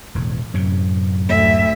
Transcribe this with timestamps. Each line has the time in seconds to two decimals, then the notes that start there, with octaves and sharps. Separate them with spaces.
0.15 E1 A2
0.54 F#2 A2 C3
1.28 D2 E5